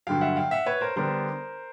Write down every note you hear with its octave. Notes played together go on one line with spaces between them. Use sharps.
G2 D3 F#3 F5 G5
E5 F#5
F5 G5
E5 F#5
B4 C#5
A#4 C5
D3 G3 B3 D4 A#4 C5